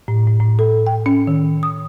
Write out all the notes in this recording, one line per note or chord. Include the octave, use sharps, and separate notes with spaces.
A2
A2
A2
A4
G5
C#4
D#3
D#6